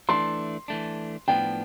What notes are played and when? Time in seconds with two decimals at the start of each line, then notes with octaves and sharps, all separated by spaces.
0.09 E3 A3 D4 C6
0.68 E3 A3 D4
1.28 A2 F3 B3 D4 G5